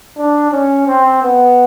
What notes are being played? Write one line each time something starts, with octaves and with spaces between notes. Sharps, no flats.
D4
C#4
C4
B3